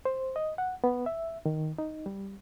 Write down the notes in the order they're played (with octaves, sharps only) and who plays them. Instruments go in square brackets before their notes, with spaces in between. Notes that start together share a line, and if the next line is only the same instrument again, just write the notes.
[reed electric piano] C5
D#5
F#5
B3
E5
D#3
D#4
G3